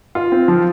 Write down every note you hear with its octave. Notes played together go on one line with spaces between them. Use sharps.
F4
C4
F3